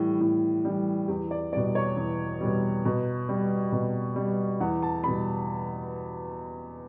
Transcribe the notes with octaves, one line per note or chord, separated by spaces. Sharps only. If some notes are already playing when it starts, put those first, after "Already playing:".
Already playing: A2 E3 G3
A2
E3 G3
E2 G4
D5
B2 G3 D5
C#5
E2
B2 G3
B2
G3
B2
G3
E2 F#5
A5
B2 G3 B5